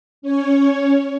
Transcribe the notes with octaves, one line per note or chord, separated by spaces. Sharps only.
C#4 C#5